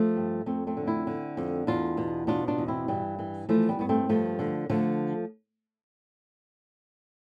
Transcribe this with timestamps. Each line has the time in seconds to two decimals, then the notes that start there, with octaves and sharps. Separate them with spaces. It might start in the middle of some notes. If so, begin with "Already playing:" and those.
Already playing: F3 A3
0.16 G2
0.46 F2 A3 C4
0.67 A3 C4
0.77 D3
0.87 C4 E4
1.07 D3
1.37 F2
1.67 E2 D4 F4
1.97 B2
2.27 B2 D4 F4
2.48 D4 F4
2.58 E2
2.68 C4 E4
2.88 G2 E3 G3
3.19 E3
3.49 E3 F3 A3
3.69 G3 B3
3.79 G2 B3
3.89 A3 C4
4.09 G2 F3 A3
4.39 D3
4.70 D3 F3 A3